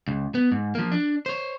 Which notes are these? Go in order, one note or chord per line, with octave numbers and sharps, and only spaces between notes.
C#2
B3
G#2
F3 A#3
D4
C5 C#5